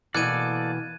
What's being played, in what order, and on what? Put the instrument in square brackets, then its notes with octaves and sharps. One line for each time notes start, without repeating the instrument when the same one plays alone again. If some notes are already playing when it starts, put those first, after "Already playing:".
[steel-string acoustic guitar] B2 E3 [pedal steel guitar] A#3 A4 D5 [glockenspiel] F#6 G#6 D#7